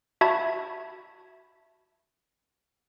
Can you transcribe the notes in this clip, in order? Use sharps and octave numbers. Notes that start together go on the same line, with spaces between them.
F#4 E5 A5 B5 G#6